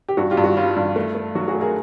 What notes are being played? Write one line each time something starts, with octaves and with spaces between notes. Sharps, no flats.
G4
G2 F#4
F4 G4
G2
F#4
G3 F4
G2
A3
A3
F#3 F#4
F#4 G#4
A3
G#4 A#4